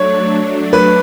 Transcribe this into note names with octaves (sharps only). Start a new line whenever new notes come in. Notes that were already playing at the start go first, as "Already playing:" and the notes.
Already playing: F#3 A3 D4 C#5
B4